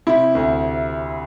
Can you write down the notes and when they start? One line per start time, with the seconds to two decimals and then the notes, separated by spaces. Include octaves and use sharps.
0.07 C3 E4
0.35 D2